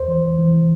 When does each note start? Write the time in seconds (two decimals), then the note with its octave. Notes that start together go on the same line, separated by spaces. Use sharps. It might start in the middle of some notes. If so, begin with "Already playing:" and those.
Already playing: E2 C5
0.08 E3
0.23 E2
0.38 E3